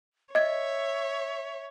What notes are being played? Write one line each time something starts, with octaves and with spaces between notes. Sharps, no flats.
C#5 D#5 E5 G#6